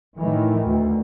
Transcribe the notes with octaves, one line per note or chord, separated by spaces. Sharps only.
A2 D#3 E3
D2